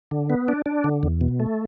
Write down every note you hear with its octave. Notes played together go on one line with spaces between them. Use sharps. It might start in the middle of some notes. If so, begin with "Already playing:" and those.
D3
B3
D4
D4
D3
E2
B2
A3